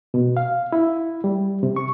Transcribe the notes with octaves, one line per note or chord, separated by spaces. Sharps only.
B2
F5
E4
G3
C3
C#6